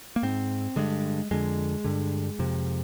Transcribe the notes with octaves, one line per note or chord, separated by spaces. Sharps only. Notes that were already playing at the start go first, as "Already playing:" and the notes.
A#3
G#2 C4
G2 D3 G#3
F2 D3 G#3
G2 D3
F2 C3